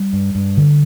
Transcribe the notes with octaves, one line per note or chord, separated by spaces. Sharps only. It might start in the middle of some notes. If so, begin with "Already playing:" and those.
Already playing: G3
G2
G2
D3